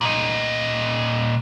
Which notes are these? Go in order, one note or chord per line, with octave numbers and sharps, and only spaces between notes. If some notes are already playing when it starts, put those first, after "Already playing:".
A#2 D#5